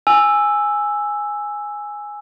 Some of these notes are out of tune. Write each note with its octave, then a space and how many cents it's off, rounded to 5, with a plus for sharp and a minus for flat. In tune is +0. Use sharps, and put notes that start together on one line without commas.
G#5 +0 E6 +0